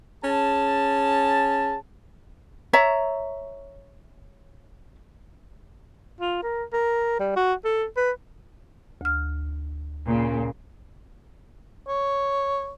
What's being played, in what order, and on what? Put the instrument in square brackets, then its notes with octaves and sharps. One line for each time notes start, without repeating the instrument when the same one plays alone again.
[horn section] C#4 G#4 A5
[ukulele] C#5 E5 A#5
[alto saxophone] F4
A#4
A#4
G3
F#4
A4
B4
[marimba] D2 F6
[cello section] A#2 C#3
[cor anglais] C#5